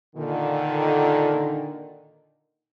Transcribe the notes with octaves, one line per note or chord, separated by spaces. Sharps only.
A#2 D3 D#3